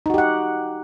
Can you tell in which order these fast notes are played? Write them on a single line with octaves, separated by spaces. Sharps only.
D#4 F#4 G4 F#5